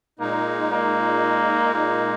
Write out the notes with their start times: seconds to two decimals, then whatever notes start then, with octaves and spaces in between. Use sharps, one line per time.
0.19 A#2 G#3 A#3 D#4
0.72 A#3
1.74 A#3